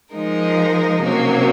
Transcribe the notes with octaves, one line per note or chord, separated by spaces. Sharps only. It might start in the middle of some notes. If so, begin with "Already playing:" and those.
F3 G#3 D#4 A#4
C3 F#3 A#3 C#4